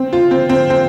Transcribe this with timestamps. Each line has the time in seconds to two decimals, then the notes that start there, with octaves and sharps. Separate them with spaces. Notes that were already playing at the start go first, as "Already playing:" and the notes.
Already playing: C4
0.13 F4
0.31 C4
0.49 C4
0.70 C4